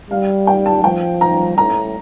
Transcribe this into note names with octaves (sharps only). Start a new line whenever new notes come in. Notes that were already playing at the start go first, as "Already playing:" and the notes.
G3 F5
G5
A5
F3 G5
A#5
A2 A#5